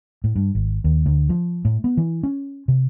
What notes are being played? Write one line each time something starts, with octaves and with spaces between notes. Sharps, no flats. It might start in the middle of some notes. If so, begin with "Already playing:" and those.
A2
G2
G#1
D#2
D2
F3
A2
B3
E3
C#4
C3